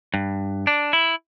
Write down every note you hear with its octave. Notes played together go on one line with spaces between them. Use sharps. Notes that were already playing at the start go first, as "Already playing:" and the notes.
G2
D4
E4